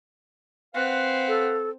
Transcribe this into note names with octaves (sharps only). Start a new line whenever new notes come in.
C4 B4 F5 F#5
A4